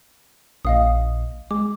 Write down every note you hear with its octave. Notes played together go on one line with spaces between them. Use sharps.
A#1 D#5 F5 D#6
G#3 D6